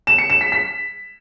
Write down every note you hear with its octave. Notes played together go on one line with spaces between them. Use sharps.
E7
C#7
E7
B6
B6